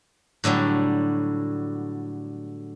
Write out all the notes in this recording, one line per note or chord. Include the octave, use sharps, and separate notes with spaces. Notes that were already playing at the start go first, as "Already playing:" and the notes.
A2 D3 F#3 G3